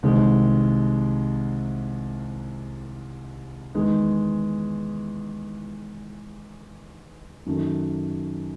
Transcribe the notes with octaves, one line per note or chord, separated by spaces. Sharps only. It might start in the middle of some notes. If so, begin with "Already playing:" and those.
C2 C3 D#3 G#3
E2 D#3 G#3 D#4
F#2 D#3 A3